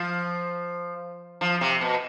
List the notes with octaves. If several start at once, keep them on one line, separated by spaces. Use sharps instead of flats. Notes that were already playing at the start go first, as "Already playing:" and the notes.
Already playing: F3
F3
C3
B2